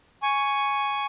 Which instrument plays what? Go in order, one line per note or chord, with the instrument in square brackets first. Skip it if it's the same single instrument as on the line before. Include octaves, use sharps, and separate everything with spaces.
[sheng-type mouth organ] G#5 C#6